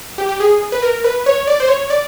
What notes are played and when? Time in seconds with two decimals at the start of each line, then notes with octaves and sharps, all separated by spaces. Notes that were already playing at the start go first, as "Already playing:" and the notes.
0.18 G4
0.29 G4
0.40 G#4
0.72 B4
0.82 A#4
1.04 B4
1.26 C#5
1.47 D5
1.60 C5
1.69 C#5
1.90 D5